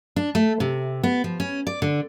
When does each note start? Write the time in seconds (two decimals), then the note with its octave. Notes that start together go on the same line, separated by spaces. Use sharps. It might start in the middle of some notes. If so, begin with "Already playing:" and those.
0.16 D4
0.35 A3
0.60 C3
1.03 B3
1.24 F3
1.40 C#4
1.67 D5
1.82 D3